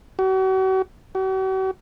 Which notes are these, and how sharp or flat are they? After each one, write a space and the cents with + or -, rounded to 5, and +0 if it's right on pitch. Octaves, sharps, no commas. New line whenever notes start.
F#4 +40
F#4 +45